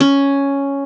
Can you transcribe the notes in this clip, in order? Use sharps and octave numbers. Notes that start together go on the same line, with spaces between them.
C#4